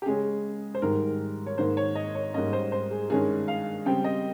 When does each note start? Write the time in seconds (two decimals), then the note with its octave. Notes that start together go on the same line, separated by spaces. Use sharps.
0.02 G4
0.06 C#3 G#3 C#4 G#4
0.75 C5
0.82 G#2 D#3 G3 A#4
1.46 C#5
1.58 G#2 D#3 A#3 C5
1.77 C#5
1.95 D#5
2.15 C#5
2.34 G#2 G3 A#3 C#4 D#5
2.53 C5
2.72 C5
2.91 G#4
3.10 G2 D#3 G#3 C#4 G#4
3.48 F5
3.86 C#3 G3 C4 G5
4.04 D#5